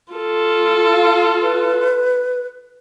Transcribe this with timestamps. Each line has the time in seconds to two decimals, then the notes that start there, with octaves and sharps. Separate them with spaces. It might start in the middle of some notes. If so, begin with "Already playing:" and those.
0.13 F4 A4
0.92 F5
1.42 B4